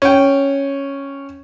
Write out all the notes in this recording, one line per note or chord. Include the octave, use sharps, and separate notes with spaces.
C#4 G5